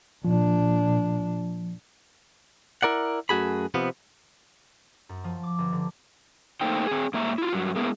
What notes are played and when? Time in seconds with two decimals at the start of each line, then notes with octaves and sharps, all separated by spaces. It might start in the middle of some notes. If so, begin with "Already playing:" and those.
0.25 A#2 F3 D4
2.83 E4 A#4 D5 F#5
3.29 F#2 A3 F#4 G#4 B5
3.74 C3 F3 B3
5.09 F#2
5.24 F3
5.43 D6
5.58 G1
5.72 D3
6.61 A3 A#3 D#4 C5 G5
6.87 C4 G#4
7.14 G#2 A#3 E5 A#5
7.38 E4 F4
7.53 G2 F#3
7.76 G#3 A#3 B3 E4